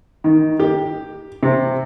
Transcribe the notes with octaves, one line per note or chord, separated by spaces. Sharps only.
D#3
G4
C3